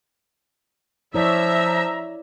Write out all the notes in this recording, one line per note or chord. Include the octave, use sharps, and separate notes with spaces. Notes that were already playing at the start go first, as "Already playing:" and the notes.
F3 E4 C#5 D5 E5 A#5